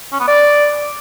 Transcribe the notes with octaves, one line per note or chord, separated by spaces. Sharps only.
C#4
B3
D5